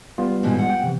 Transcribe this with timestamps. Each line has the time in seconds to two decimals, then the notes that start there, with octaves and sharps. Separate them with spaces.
0.18 G3 B3 F4
0.43 G#2 B2 E3
0.59 F#5
0.70 G5
0.84 C3 E3